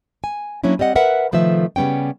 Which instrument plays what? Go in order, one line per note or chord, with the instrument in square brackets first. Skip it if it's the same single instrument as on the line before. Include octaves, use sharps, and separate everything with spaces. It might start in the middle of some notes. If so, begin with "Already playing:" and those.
[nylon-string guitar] G#5
F#3 A#3 C#4 D4 E4
G3 C4 D#5 F#5
A#4 B4 E5 F#5
C3 D#3 F3 A3 B4 E5
C#3 G3 B3 C#4 G5